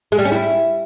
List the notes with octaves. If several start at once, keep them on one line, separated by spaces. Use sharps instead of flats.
G#3
G3
C#4
E4